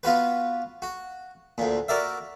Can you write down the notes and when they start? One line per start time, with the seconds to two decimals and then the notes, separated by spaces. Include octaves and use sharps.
0.03 B3 F4 F#4 B4
0.82 F#4
1.58 D2 A#2
1.88 F#4 A#4 D5 E5